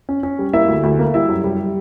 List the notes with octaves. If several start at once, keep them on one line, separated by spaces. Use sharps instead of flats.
C#4
C#4
G3
A#3 E4 E5
D2
D2
A#3
G3 E4 E5
F#2
G3